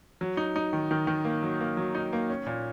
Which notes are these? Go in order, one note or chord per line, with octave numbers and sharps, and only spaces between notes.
F#3
D#4
D#4
D#3
D#3
D#3
A#3
F#3
A#3
F#3
D#4
A#3
C#4
A#2